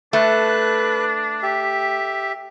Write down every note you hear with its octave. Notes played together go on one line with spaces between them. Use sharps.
A3 D4 B4 F#6
G4 E5